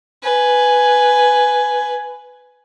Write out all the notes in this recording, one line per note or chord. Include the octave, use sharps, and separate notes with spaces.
B4 G#5